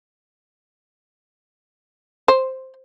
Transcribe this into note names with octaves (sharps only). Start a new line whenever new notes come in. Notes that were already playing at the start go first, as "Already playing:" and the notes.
C5